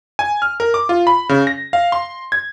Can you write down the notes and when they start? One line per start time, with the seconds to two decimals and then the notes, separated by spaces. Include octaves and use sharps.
0.19 G#5
0.42 F6
0.60 A#4
0.74 D6
0.89 F4
1.07 B5
1.29 C#3
1.47 A#6
1.73 F5
1.92 C6
2.32 G#6